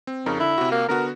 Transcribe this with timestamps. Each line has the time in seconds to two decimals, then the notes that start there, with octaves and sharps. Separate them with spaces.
0.07 C4
0.26 F2 C#3 D#4 A#4
0.40 D3 E4
0.58 C3 F#4
0.71 A#3
0.88 D3 B3 F#4 A#4